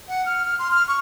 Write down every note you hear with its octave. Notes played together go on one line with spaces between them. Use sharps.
F#5
F6
F6
C6
F6
C#6